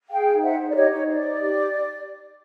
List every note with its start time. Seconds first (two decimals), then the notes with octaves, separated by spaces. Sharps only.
0.10 G#4 F5 G5
0.27 D#4
0.42 C5 E5 F#5
0.59 D#4
0.69 D5
0.74 G4 C#5 D#5
0.91 D#4 C#5
1.07 C5 D5
1.24 D#4
1.40 G4